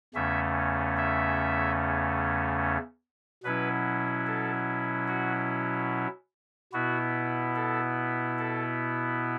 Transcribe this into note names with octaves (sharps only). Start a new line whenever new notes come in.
E2 C#3 A3 C#4 E5
E5
B2 F#3 C#4 E4 B4
A4
F#4
B2 B3 E4 F#4
A4
A4